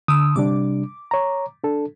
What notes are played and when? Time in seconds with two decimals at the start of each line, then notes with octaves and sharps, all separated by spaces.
0.08 D3 D#6 E6
0.36 C3 G3 D4 D6
1.11 C#5 A#5
1.63 D4 A4